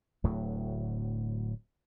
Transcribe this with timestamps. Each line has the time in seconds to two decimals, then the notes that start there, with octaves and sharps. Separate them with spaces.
0.24 D1 D2 A2 F#3